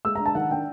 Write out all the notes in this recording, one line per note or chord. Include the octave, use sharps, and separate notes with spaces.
G#3 E6
A#5
D4
A5
D#3 F#5
D4 G5